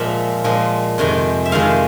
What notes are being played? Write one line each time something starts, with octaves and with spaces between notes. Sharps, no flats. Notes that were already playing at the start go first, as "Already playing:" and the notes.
Already playing: A#2 F3 G#3 E5
A#2 F3 G#3
F2 C3 D#3 G#3
E5
F2 C3 D#3 G#3 F5